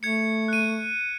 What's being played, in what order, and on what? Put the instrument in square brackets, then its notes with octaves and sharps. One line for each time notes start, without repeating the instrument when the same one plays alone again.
[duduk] A3 [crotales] G#6 C#7
[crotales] F#6 D#7